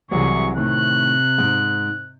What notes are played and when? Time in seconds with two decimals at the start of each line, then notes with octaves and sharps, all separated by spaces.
0.11 C2 C3 E3 F#3 G#4 C#6
0.57 A2 C3 D#3 F#6
1.38 G#2